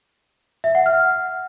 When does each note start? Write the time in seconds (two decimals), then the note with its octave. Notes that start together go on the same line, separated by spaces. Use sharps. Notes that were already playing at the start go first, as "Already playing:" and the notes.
0.64 E5
0.75 F#5
0.86 F6